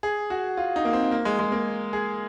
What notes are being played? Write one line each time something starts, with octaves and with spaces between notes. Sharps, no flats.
G#4
F#4
F4
D#4
A#3
C4
A#3
G#3
G#3
A#3
G#4